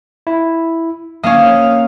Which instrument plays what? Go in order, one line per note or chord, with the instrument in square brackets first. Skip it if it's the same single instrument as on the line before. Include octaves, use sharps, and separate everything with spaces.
[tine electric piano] E4
[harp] A#3 C#4 [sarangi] F5 [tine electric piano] D#6